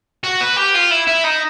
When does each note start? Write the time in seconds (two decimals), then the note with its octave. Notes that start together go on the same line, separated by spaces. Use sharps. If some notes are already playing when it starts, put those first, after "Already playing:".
0.24 F#4
0.41 B4
0.57 G4
0.75 F4
0.91 E4
1.08 E4
1.24 D#4